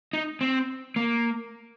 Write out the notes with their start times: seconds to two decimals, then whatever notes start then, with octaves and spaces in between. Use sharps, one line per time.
0.13 D#4
0.41 C4
0.96 A#3